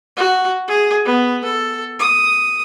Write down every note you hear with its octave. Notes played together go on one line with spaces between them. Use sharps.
F#4
G#4
B3
A4
D#6